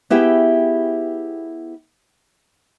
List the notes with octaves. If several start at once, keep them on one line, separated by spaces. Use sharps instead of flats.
B3 E4 G4 G#4 E5 G5